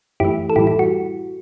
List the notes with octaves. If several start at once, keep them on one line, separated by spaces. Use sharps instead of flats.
F#2 E3 A3 E4 G4
A4
A2 E3 G3 E4 G4
E4
F#4